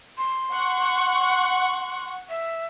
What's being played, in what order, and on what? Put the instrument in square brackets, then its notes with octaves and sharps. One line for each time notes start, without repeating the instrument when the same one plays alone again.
[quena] C6
[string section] F#5 C#6
[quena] E5